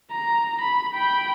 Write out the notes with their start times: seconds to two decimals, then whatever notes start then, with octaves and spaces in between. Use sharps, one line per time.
0.12 A#5
0.61 B5
0.94 G5 B5